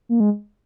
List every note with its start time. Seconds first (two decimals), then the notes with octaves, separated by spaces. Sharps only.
0.09 A#3
0.20 G#3